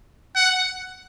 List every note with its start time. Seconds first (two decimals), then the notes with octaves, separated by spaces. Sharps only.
0.36 F#5